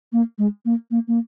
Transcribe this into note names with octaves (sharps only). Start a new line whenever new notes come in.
A#3
G#3
A#3
A#3
A#3